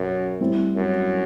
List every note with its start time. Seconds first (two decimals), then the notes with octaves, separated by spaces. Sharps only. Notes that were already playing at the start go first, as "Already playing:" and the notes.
Already playing: F#2 B2
0.40 A2 G3 C4 E4
0.76 F#2